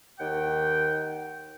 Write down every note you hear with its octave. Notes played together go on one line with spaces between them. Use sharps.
D#2 D#3 F#5 G5